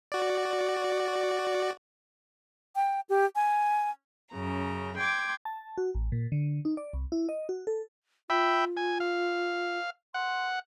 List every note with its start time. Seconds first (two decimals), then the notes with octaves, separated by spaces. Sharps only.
0.12 F#4 D5
2.76 G5
3.09 G4
3.36 G#5
4.33 F#2 C#3 A#5
4.96 G5 C6 D6 G#6
5.45 A5
5.78 F#4
5.95 A1
6.12 A#2
6.32 D3
6.65 D#4
6.77 D5
6.93 C2
7.12 E4
7.29 D#5
7.49 F#4
7.67 A4
8.30 F4 E5 G5 B5
8.77 G#5
9.00 F5
10.14 F#5 C6